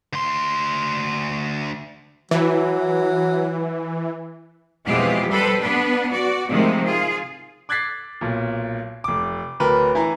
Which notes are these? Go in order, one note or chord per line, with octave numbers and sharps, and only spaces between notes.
D2 C6
E3 F#3
F2 B2 E3 G#3 F4 G4
G3 A4 B4 C5
B3 D4 B4
F#4 D5
C3 D#3 F3 G#3 A3
F4 G#4
D6 F#6 G#6 A6 B6 C7
B1 A#2
F1 D6
D1 A#4 B4
E3 G#5 A#5